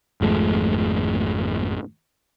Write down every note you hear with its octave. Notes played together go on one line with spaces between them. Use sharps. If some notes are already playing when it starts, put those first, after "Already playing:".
G#1 F2 G#3 A3